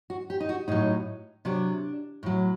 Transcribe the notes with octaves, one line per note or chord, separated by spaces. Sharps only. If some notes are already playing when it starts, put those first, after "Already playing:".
F#4
G4
D#4
F#4
A2 F#3 D#4
C3 F#3 D4
A2 F#3